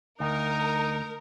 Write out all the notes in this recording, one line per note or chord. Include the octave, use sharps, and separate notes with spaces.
D2 D#4 A#4